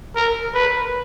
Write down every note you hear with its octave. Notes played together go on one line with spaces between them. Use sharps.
A#4
B4